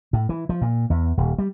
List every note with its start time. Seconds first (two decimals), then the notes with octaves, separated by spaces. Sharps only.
0.13 A2
0.29 E3
0.49 F3
0.61 A#2
0.90 E2
1.17 D#1
1.38 G3